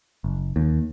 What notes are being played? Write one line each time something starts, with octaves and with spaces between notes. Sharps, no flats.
F#1
D#2